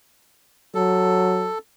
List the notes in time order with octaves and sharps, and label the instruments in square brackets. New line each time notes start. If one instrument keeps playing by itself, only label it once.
[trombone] F#3 [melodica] A4